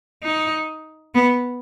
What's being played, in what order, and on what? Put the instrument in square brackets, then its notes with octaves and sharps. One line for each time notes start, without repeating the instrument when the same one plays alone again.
[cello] D#4
B3